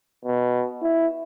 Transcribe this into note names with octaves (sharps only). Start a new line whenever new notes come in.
B2
E4